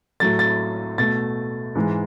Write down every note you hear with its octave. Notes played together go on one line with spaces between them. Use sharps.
A2 F#3 A3 A6
A6
B2 A3 A6
G#2 E3 G#3